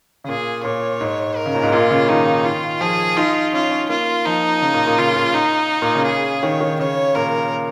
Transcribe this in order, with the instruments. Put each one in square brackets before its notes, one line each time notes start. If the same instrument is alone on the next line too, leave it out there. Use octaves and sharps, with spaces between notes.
[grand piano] C#3
[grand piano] A#2 [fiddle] G#4
[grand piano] A#2 [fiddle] C#5
[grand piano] G#2
[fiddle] A#4
[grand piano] C#3
A#2
G#2
[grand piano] A#2 [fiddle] F4
[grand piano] C#3
[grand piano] D#3 [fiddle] D#4
[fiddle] F4
[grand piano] F3 [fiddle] G#4
[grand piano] D#4 [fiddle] F4
[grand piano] C#4 [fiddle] F4
[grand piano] C#4
[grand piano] A#3 [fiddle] F4
[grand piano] F3 [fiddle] D#4
[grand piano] C#3
A#2
A#2
[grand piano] C#3 [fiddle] F4
[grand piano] A#2
[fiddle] D#4
[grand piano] A#2
C#3
[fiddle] G#4
[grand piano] D#3 [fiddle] C#5
[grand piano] D#3
[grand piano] C#3 [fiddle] C#5
[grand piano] A#2 [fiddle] A#4